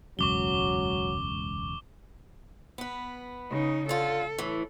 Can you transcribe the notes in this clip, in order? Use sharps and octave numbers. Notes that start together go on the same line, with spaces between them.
E1 C#2 F#2 F#3 C#6 D6 G7
B3 B4
C#3 D#4
D3 F4 A4
A2 E3